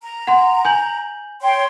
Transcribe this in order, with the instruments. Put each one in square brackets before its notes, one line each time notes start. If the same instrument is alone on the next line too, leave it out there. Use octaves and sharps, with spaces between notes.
[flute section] A#5
[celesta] F#5 C6
G#5 G6 F#7
[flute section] C#5 G5 C6